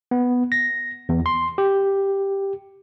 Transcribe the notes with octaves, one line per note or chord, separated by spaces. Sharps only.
B3
A#6
E2
C6
G4